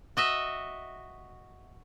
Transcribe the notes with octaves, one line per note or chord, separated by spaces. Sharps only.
F#4 D#5 E5